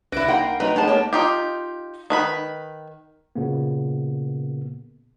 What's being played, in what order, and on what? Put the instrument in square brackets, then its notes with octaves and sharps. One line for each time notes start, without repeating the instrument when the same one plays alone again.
[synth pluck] C2 A#6 D7 [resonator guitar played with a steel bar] D3 E4 [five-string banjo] B4
[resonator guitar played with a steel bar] A#3 [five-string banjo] D#4 F#5 [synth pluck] G5 C6
[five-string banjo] F#3 A3 D#4 [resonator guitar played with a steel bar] B4 A#5
[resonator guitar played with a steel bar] G#3 B3 A5 [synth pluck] A3 G#4 [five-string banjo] D#4 C5
[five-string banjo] A#3 C#5 [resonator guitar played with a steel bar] G4 A5
[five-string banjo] D#4 F4 G4
D#3 B4 B5
[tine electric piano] A#2 C#3 A#3 B3